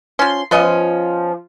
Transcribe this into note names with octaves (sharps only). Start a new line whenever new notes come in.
F3 C#4 C6
F3 B3 C#4 D#5